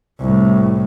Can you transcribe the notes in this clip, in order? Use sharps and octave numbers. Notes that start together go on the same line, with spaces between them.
C2 A2